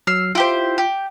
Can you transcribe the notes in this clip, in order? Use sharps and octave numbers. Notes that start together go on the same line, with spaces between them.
F#3 E6 F6 C7
E4 F4 G4 C5
G4